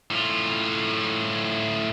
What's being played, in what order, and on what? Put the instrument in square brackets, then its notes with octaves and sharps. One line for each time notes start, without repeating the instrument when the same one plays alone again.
[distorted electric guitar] A2 F4